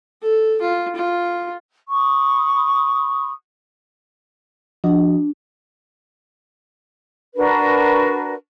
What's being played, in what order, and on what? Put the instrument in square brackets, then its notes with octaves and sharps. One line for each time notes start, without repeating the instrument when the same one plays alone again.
[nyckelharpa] A4
F4
F4
[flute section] B5 C#6 D#6
[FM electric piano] F3 F#4 D#5 [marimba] D4
[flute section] D4 F#4 A#4 B4